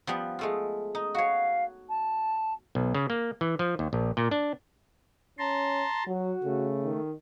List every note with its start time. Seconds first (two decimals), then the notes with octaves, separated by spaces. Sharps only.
0.07 F3 G3 B3
0.39 G#3 A3 F4
0.95 D#4
1.15 F#4 C#5 F5
1.89 A5
2.75 B1
2.94 C#3
3.10 A#3
3.41 E3
3.59 F3
3.79 D#2
3.93 A#1
4.17 A#2
4.31 D4
5.39 C#4 A5 A#5 C6
6.06 F#3 F#4
6.43 C#3 A3
6.84 D#3